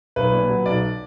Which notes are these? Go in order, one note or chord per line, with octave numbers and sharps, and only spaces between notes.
B1 B4
A#2
F#3
B1 D5